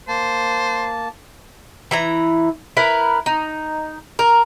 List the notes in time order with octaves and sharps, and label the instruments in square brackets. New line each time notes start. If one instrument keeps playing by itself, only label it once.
[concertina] A#3 A5 [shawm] C5
[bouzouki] E3 E4 A#5
E4 A#4 B4
D#4
A#4